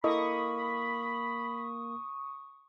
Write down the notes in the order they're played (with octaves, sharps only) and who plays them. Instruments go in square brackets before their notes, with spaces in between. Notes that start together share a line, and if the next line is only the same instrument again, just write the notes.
[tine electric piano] A#3 [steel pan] E4 A4 D#5 [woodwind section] B5 [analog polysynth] C#6 D#6